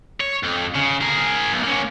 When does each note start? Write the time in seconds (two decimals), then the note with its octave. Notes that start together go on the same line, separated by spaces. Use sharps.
0.21 C#5
0.44 F2
0.75 C#3
1.01 G#4 A#4
1.52 B1
1.63 A#3 C#4